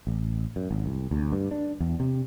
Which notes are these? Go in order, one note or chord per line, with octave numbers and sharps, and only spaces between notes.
A1
F#2
G#1
C2
D2
G2
D4
E2
C3